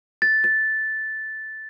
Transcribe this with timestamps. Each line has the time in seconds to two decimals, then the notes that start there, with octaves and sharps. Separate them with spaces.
0.22 A6
0.44 A6